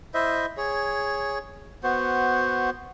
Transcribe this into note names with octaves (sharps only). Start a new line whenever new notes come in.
E4 C5 D#5 E5
G#4 C#5
B3 F#4 C5